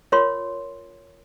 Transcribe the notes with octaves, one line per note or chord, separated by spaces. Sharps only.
F4 A#4 C#5 C6